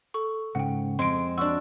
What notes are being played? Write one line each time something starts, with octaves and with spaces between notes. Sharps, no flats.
A4 C#6
G#2 C#3 F#5 G5
F2 G#3 C4 C6 D7
D4 F#4 E6